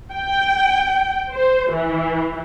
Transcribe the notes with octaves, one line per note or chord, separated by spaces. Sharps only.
G5
C5
E3